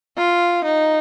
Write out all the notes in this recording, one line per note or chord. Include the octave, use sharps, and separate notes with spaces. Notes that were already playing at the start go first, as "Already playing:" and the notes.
F4
D#4